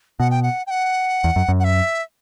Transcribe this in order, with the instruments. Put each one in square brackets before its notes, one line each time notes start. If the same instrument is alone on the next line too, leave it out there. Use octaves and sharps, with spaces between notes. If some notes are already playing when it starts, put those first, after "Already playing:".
[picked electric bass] B2 [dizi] F#5
[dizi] G5
F#5
G5
F#5
[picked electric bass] E2
F#2
F#2
[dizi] F#5
E5